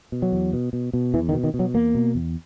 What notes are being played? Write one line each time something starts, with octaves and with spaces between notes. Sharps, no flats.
B2
F#3
E2
B2
B2
B2
E2 E3
D#3
B2
D#3
B2
F#3
E2 A#3
B2
E2